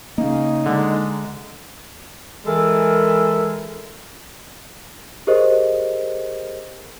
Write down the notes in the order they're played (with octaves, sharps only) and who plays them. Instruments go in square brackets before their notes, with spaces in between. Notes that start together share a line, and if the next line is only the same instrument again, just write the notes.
[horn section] C#3 [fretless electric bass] A#3 [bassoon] D#4
[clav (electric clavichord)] D3 [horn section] G#3
[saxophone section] E3 G#3 A4 A#4
[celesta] G4 G#4 A#4 C5 D#5